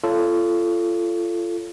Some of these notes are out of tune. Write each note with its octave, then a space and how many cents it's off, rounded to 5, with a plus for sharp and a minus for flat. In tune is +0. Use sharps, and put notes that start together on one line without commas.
F4 -25 A4 -5 C#5 +0